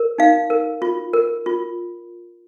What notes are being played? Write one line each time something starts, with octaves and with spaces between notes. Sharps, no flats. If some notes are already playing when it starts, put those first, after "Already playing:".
Already playing: A#4
D#4 F5
A#4
F4
A#4
F4